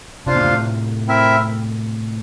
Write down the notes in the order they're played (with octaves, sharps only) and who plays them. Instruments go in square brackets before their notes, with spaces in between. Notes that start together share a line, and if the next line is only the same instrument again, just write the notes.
[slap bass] C3 [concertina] D4 F4 C5 F5
[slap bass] A#2
A2 C3
[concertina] C4 E4 A#4 E5